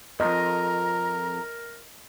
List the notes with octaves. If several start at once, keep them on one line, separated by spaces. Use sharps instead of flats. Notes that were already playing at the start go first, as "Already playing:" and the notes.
C2 F2 A#4 D#5 A#5